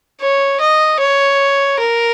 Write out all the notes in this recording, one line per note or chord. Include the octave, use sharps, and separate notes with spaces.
C#5
D#5
C#5
A#4